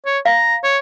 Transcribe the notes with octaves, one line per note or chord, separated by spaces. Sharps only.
C#5
F5 A#5
C#5